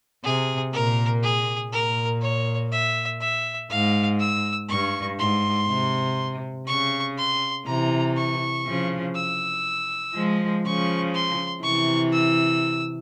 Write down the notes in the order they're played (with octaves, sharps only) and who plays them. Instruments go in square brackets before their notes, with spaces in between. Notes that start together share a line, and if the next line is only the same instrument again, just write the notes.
[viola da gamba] C3 [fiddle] G#4
[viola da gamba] A#2 [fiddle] A#4
[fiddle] G#4
[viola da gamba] A#2 [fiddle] A#4
[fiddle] C#5
E5
E5
[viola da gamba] G#2 [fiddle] F5
[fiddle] E6
[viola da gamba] G2 [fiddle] C#6
[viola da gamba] G#2 [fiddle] C6
[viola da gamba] C3
[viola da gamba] C#3 [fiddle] C#6
[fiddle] C6
[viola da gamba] C3 E3 [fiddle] A#5
[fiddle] C#6
[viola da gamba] C#3 F3
[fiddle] E6
[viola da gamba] F3 G#3
[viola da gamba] C#3 F3 [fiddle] C#6
[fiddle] C6
[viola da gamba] C3 E3 [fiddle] C#6
[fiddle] E6